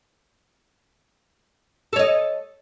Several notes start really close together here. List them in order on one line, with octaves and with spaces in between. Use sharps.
A4 C#5 D#5